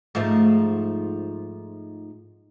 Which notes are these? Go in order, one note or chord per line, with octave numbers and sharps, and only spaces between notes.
G#2 F3 A3